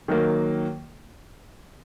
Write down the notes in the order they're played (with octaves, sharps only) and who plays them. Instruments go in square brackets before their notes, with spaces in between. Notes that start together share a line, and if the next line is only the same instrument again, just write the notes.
[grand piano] D#3 F#3 A#3